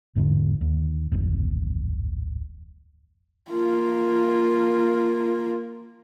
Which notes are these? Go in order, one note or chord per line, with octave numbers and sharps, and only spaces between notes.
G1 E2 G#2 D3
D#2
D1 G#1 F2
A#3 F4